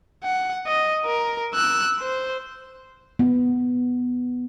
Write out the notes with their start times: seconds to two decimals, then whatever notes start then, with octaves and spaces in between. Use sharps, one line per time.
0.24 F#5
0.67 D#5
1.06 A#4
1.54 E6 F#6
2.00 C5
3.19 B3